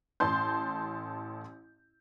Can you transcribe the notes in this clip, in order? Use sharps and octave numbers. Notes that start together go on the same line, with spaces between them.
A1 A5 C6 G6